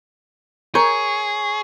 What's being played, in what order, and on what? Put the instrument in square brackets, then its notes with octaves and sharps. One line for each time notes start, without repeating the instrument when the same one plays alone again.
[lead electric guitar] G#4 [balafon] A#4 A#5 [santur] C#5